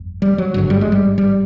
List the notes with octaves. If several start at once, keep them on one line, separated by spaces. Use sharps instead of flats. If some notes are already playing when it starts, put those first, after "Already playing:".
Already playing: G1 F2
G3
F#3
G#1 G2 D3 F#3
G3
G#3
G3
G3